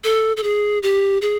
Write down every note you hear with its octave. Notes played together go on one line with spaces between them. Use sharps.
A4
A4
G#4
G4
G#4